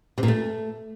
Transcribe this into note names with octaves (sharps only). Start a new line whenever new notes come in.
C3
A#2
A3